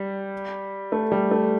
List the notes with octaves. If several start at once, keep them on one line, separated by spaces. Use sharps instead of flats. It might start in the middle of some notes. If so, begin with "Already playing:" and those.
Already playing: G3
A3
G3
A3